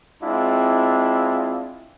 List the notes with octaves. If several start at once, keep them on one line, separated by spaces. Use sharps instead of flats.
G#3 C4 D4 E4 F4